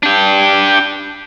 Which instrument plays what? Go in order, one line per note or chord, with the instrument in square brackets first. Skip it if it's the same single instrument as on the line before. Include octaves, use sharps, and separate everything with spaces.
[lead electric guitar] D4 G4